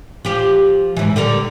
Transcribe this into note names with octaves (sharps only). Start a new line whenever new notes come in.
F3 G4
G#2 E3
D3 G3 A#4